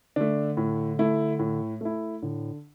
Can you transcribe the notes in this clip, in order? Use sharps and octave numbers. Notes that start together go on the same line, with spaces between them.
D3 A3 D4
A2
A3 E4
A2
A3 E4
A2 D3